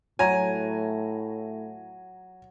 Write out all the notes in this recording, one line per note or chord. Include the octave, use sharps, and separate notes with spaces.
A2 F#3 G#5 A#5